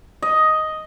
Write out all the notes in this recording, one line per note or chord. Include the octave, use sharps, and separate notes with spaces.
D#5